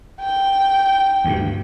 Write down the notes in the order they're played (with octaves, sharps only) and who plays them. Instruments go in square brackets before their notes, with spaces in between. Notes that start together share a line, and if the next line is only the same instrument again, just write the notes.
[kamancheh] G5
[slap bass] D2 G2